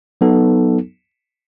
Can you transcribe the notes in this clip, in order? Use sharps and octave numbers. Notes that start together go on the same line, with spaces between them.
F#3 B3 D#4 A4